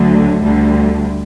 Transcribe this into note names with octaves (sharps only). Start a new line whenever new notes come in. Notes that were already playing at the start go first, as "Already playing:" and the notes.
Already playing: D2 D3 F#3 A3
D2 D3 G3